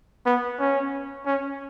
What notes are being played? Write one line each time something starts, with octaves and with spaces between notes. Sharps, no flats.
B3
C#4
C#4